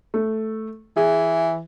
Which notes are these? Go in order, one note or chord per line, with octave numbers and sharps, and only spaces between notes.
A3
E3 G#4